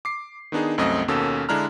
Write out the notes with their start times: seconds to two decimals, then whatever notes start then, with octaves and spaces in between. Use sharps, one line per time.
0.05 D6 C7
0.52 D#3 B3 D4 D#4 G#4
0.78 C2 F#2 A3 C4 D#5
1.08 D#2 B2 A#3 C#4 A4 E6
1.49 D3 G#3 D4 E4 A#5 F6